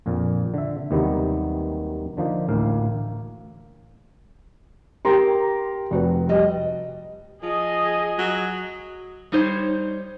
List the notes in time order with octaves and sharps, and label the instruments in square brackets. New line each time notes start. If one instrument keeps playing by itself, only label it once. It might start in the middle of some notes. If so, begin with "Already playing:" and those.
[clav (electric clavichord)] A#1 F2 A#2
D3 E5
D#2 C3 D#3 F#3 G3 B3
D3 F3 A#3 D#4
A1 D2 A2 A#3 F5
[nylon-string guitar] G4 G5 [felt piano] A#4 A#5 C6
[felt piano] F1 F#4 B4
[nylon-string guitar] G3 D#5
[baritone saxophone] F3 [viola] G#4 D#5
[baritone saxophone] F#3
[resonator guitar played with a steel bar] G3 D#4 C5 C#5